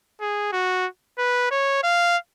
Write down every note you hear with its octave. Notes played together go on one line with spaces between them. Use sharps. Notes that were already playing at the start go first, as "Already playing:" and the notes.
G#4
F#4
B4
C#5
F5